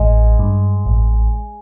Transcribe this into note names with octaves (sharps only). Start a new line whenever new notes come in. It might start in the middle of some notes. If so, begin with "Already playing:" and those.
Already playing: A1 G#3
G2
A1